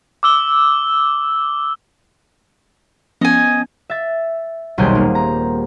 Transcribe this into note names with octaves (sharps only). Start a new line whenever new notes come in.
D6 E6 G7
F3 B3 C#4 D#5 G#5
E5 A6
D#1 B1 G3 C4 G#4 G6
A#3
A#5